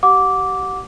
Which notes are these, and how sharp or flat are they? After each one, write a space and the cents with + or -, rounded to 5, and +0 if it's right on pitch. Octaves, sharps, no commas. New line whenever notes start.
G4 -30 F#5 -25 D6 -10